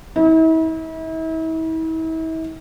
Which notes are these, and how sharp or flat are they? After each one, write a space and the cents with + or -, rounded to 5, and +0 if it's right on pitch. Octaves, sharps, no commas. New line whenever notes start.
E4 -40